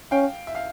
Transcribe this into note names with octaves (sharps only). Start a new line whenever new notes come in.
C#4 F5 G5
E5
F5